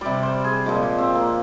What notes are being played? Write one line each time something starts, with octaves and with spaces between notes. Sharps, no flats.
C3 G3 D5
C5
G#4
A#2 F3 G#3 G4
C4
A#3